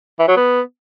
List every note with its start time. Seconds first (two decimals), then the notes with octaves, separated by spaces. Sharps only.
0.19 E3
0.28 F#3
0.37 B3